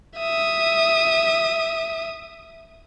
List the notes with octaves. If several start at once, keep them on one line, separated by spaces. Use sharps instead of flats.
E5 D#6